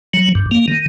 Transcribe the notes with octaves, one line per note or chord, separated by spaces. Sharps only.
F#3
G2
A#3
D#3